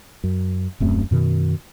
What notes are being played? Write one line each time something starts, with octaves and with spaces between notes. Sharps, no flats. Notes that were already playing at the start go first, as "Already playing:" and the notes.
F#2
D#1 F#2 A3 C4
F#2 B2 D#3